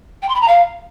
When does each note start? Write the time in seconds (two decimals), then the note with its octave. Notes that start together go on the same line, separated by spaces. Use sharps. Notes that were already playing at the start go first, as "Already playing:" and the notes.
0.22 G5
0.29 C6
0.35 B5
0.42 A#5
0.48 F5